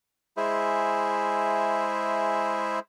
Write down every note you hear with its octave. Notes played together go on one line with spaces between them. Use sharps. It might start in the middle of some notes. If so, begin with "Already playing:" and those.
G#3 E4 G#4 C5 E5